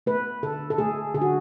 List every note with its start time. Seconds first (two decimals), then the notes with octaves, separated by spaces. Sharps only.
0.06 A3 B4
0.43 D3 A4
0.70 A4
0.78 A3 G#4
1.14 D3 G#4
1.22 F#4